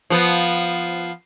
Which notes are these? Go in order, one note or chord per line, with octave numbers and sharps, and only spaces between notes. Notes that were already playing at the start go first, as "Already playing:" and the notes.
F3 B3